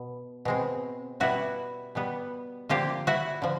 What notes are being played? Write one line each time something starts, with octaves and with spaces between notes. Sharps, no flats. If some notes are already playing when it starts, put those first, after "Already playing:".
Already playing: B2
B2 G#3 C4
B2 G3 B3 E4 F#4
B2 G3 B3
D3 F3 A#3 F4 G4
E4 F#4
D3 F3